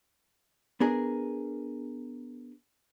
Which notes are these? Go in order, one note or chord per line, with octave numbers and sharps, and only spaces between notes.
B3 D4 G#4 A#4